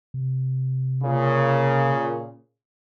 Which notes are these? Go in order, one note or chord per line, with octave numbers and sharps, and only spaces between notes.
C3
A#2 C#3